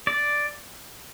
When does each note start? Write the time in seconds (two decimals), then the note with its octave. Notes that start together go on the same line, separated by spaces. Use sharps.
0.07 D5